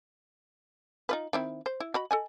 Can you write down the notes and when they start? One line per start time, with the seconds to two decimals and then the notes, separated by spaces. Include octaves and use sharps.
1.09 D#4 F4 B4
1.33 D#3 C4 E4
1.66 C5
1.80 E4
1.94 F#4 D#5 B5
2.11 A4 D#5 G#5